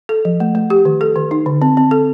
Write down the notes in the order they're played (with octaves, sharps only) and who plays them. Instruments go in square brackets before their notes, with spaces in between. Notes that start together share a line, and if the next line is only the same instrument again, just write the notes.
[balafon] A4
F3
A3
A3
G4
D#3
A4
D#3
D#4
D3
C4
C4
A4